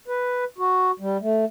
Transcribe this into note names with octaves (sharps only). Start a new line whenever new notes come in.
B4
F#4
G3
A3